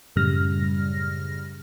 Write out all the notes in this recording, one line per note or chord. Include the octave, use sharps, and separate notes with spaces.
F#2 A2 C#3 G3 F6 A#6